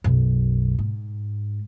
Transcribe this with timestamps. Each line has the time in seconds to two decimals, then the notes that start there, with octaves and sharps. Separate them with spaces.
0.04 B1 F#2
0.79 G#2